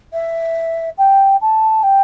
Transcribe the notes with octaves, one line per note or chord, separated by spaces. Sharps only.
E5
G5
A5
G5